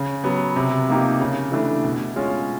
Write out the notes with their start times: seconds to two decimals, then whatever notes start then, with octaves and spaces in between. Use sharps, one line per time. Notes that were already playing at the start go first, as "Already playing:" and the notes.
Already playing: C#3
0.24 F#3 B3
0.56 C3
0.88 F3 A#3 D#4 G4
1.21 C#3
1.52 E3 A3 D4
1.84 B2
2.16 G#3 C#4 F4